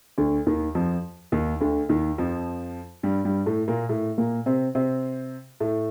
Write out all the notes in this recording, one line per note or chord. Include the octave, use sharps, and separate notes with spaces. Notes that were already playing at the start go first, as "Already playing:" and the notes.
D2 D3
D#2 D#3
F2 F3
D#2 D#3
D2 D3
D#2 D#3
F2 F3
G2 G3
G2 G3
A2 A3
A#2 A#3
A2 A3
A#2 A#3
C3 C4
C3 C4
A2 A3